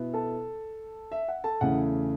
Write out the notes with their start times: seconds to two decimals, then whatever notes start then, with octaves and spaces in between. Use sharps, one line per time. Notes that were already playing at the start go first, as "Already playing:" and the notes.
Already playing: B2 B3 E4
0.14 A4 A5
1.12 E5
1.28 F#5
1.44 A4 A5
1.61 E2 C#3 E3 A3 C#4 F#5